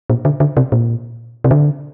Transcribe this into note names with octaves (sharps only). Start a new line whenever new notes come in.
A#2
D3
D3
C3
A#2
C3
D3